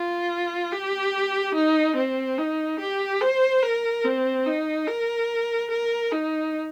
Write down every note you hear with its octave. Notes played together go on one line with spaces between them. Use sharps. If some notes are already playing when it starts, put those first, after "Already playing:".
Already playing: F4
G4
D#4
C4
D#4
G4
C5
A#4
C4
D#4
A#4
A#4
D#4